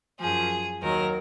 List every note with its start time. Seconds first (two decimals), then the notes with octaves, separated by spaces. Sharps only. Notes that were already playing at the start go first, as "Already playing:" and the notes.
0.20 F#2 F3 G#4
0.82 D#2 D#3 F#3 A#4